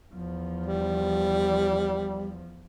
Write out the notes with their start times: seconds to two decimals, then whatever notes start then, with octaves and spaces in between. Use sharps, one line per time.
0.14 E2 F3
0.66 G3